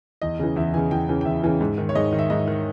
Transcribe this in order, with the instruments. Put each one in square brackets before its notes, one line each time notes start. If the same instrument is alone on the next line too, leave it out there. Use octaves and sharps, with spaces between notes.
[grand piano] E2 D#5
C#3 E3
E2 E5
C#3 E3 G#5
E2 G5
C#3 E3
G5
E2 E5
C#3 E3
G#2
D#3
C#5
G#2 D#5
D#3
E5
G#2 D#5
D#3